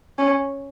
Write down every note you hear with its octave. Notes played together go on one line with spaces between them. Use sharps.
C#4